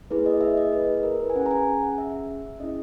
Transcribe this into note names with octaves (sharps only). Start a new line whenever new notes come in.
A#3 E4 G#4 B4
D#5
E5
D#5
B4
A#4
B4
G#5
C#4 G#4 F#5
A#5
G#5
F#5
E5
C#4 E4 G#4 D#5